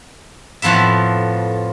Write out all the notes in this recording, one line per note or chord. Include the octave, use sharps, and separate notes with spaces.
F2 A2 F3 B3 E5